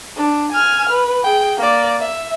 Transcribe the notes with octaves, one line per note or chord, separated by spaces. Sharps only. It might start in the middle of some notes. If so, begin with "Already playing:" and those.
D4
G#5 F6
B4
G#4 G5
A#3 D5
E5